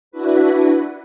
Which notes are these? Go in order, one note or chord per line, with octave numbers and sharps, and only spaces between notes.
D4 E4 F#4 B4